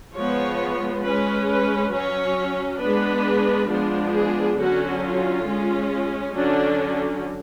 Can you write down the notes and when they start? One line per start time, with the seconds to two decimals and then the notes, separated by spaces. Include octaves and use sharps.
0.15 F3 G#3 B3 C#5
1.04 G#3 C#4 B4
1.49 B4
1.92 F#3 C#4 C#5
2.81 G#3 B3 D4 B4
3.69 F3 G#3 B3 D4
4.14 G#4
4.58 D3 F#3 C#4 F#4
5.03 F4
5.47 G#3 C#4
6.35 D3 F#3 C#4 D4